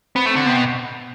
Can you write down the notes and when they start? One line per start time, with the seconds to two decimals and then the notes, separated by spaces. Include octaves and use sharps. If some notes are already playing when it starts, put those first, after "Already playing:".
0.15 B3 C4
0.26 A3
0.31 C4
0.36 D3
0.46 C3 B3
0.56 B2